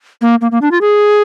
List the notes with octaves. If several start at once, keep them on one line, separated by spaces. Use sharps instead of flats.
A#3
A#3
A#3
D4
F4
G#4